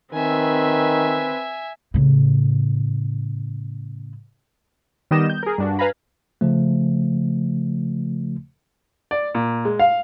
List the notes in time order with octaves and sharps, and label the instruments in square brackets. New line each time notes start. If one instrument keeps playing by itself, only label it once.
[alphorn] D#3 [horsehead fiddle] C4 B4 [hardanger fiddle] E5 G#5
[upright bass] A2 C#3
[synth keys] D#3 G3 B3 G4 D#5 E7
G6
G#4 A#4
G2 D4 F#4
B4 F5 G#5 A#5 B5
[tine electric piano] C#3 F3 A3
[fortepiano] D5
A#2
G#3
F5